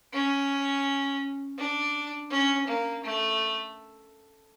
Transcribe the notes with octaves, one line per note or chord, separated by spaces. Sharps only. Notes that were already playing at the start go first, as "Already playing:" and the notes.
C#4
D4
C#4
A#3
A3